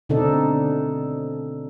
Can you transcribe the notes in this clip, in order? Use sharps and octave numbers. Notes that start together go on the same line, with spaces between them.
B2 D3 C4 D4 D#4 A4